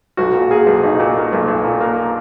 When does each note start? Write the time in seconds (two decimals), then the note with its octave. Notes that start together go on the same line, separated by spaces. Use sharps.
0.17 B1 F#4
0.35 A#2
0.50 A#3 G#4
0.67 B1
0.83 B1 D#4
1.00 A#2
1.16 A#3
1.32 B1
1.48 B1
1.64 A#2
1.81 A#3